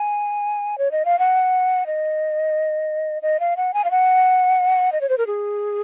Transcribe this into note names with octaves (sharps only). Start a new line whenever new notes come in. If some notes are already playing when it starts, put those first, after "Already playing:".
Already playing: G#5
C#5
D#5
F5
F#5
D#5
D#5
F5
F#5
G#5
F5
F#5
D#5
C#5
C5
A#4
G#4